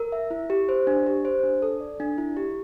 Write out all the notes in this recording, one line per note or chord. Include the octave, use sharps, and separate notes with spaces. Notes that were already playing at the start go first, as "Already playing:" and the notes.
Already playing: A#4
E5
E4
G4
C5
D4
G4
C5
D4
A4
D5
D4
E4
G4